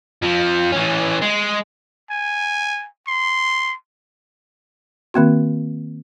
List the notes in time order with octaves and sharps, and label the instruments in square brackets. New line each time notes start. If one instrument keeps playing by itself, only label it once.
[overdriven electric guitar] F2 F3
E3 C#4
G#3
[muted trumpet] G#5
C6
[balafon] D#3 A#3 C4 F#4